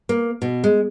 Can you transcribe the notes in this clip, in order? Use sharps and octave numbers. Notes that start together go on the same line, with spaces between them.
A#3
B2
G#3